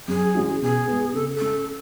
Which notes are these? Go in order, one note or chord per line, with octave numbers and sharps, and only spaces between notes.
F#2 G#4
E3 G#3 C#4 F#4
B2 G#4
G#3 B3
C#3 A4
A4
G#3 C#4